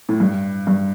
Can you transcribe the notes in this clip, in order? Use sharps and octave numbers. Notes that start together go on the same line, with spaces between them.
A2
G2
G2